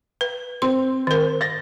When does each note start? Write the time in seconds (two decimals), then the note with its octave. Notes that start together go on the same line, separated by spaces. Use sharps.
0.21 B4
0.62 C4 C6
1.07 D#3 A#4
1.41 A6 A#6